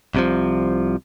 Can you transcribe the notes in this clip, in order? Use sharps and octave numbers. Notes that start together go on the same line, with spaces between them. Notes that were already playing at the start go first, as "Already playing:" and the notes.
C2 C3 F3